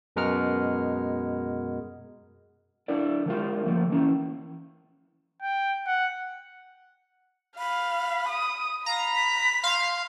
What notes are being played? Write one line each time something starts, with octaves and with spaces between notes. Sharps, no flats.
F#2 B2 G#3 A#4 F#5 F6
D4 E4 A4 D5
D#3 G#3 F4
D#3 F3 A3 A#3
E3 C#4 E4
G5
F#5
F5 B5
D#6
F5 A#5 B5
B6
F5 C6